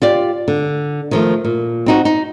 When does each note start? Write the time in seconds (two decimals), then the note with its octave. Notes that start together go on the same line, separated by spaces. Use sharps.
0.02 F4 G4 D5
0.48 D3
1.11 D#3 F3 A3
1.45 A#2
1.86 C4 D#4 F#4
2.05 D#4